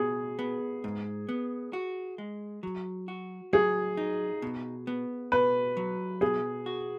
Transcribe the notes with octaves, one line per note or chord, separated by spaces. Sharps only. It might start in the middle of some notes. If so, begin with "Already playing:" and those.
Already playing: B2 G#4
B3
G#2
B3
F#4
G#3
F#3
F#4
F#3 G#4
D#4
B2
B3
B2 B4
F#3
B2 G#4
F#4